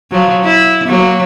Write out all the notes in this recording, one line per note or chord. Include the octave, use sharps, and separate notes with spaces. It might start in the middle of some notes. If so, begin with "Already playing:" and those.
F3 F#3
E4
F#3 A#3